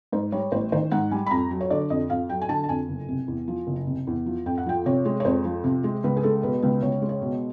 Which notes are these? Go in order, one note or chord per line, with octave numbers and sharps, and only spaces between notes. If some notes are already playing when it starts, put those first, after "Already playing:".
G#2 C5
G3 C#5
A1 C5
D#3 C5
G#2 F#5
G3 G#5
B5
F2 A#5
F#3
C#5
D3 D5
F2 D#5
F2 F5
F#3 G5
G#5
D3 A5
A5
F2 G#5
F#1
C3
E2
F3
F#1
C3
E2
F3
F2 G5
F#5
F3 G5
C3 C#5
G#3
C#5
F2 C5
F3
C3
G#3
C#2 B4
G#4
G#3 A4
B2 B4
C#2 B4
C#2 C#5
G#3
C#5
B2